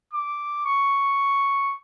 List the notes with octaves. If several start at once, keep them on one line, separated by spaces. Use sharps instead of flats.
D6
C#6